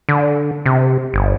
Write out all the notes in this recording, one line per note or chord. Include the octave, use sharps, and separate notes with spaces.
D3
C3
G1